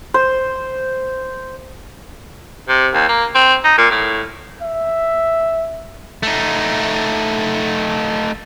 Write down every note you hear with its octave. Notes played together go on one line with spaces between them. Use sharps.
C5
C3
D#2
A#3
C4
D#4
A#2
A2
E5
A3 D#4